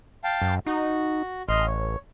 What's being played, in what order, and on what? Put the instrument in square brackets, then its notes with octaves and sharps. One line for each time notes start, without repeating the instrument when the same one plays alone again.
[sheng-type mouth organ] F5 G5 A5
[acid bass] F#2
[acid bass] D#4 [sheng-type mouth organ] F#4
[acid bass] A1 [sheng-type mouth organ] D#5 C6 F6
[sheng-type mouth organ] C#5